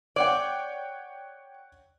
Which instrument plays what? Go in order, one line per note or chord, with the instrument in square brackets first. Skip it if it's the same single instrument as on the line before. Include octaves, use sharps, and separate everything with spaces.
[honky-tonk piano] C#5 F#5 G5 [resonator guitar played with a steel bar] D5